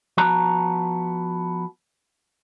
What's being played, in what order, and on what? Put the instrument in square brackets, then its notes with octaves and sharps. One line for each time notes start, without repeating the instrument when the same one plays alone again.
[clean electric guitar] F3 B3 F#4 A5 A#5